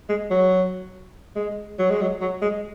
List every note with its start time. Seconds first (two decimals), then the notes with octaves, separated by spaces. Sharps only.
0.09 G#3
0.31 F#3
1.36 G#3
1.79 F#3
1.90 G#3
2.01 F#3
2.21 F#3
2.42 G#3